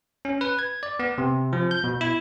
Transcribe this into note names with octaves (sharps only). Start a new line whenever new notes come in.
C#4
B4
G#6
D5
B3
C3
F3
G6
B2
E4